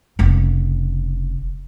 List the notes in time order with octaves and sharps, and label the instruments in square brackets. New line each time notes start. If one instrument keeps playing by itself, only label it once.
[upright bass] F1 C#3